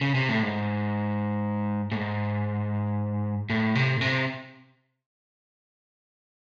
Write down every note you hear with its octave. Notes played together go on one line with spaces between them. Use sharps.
C#3
C3
A2
G#2
A2
G#2
A2
C3
A2
C3